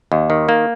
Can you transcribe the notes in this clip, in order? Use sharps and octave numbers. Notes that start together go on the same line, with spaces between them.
D#2
D#3
A#3